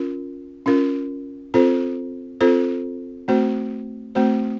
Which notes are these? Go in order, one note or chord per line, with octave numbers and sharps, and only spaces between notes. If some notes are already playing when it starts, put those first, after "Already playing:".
Already playing: C#4 F4 A#4
C#4 F4 A#4
C4 F4 A4 C5
C4 F4 A4 C5
A3 C4 F#4 C5
A3 C4 F#4 C5